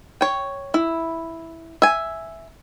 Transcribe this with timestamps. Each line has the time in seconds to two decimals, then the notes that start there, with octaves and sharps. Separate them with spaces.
0.21 C#5 G5
0.74 E4
1.82 E5 G#5